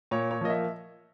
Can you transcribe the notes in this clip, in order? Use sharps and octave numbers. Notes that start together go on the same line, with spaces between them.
A#2 C#5
C#5
F3 A#3 D#5
E5